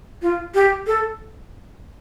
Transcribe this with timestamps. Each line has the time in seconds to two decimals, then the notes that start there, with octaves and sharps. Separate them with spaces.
0.22 F4
0.55 G4
0.87 A4